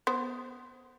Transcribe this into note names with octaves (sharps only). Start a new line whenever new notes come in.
B3 C5